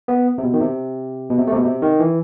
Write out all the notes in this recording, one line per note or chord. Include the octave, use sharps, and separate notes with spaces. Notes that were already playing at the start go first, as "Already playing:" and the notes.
B3
C3
B2
D#3
C3
B2
C3
A3
C3
B2
C3
D#3
E3